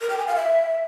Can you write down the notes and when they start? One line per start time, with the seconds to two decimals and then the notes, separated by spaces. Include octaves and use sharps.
0.01 A#4
0.10 G5
0.18 G#5
0.27 F5
0.36 E5